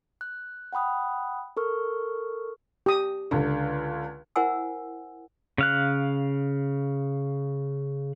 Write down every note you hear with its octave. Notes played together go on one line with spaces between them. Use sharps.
F#6
F#5 G5 B5 D#6 F#6
A4 A#4 C#6 F6
G4 D#6
C#2 D3
E4 A#4 C5 F#5 G#5 E6
C#3 F5 F#6